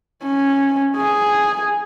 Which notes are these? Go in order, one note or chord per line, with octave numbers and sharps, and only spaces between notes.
C#4
G#4